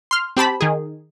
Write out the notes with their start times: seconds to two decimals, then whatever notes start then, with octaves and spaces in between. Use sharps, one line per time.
0.11 C6 F6
0.37 C4 G4 A5 B5
0.61 D#3 G#4